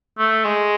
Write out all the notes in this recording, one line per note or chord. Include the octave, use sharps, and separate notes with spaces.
A3
G#3